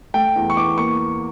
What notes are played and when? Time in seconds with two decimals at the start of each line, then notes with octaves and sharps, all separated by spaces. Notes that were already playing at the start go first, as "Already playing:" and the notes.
0.14 A3 G5
0.36 E2
0.50 C#6
0.57 E2 D6
0.78 A#3 C#6